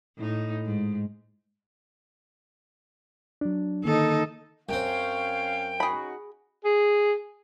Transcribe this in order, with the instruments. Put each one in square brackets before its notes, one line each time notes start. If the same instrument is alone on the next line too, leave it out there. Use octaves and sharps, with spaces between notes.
[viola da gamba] A2 D#4
G#2
[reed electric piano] F#3 D4
[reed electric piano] D3 D#3 A#3 [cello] D#4 A4
[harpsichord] F#2 C4 [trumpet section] C#4 C#5 F5 [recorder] G5
[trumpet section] C#4 D#4 F#4 [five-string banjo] G#4 B5
[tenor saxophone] G#4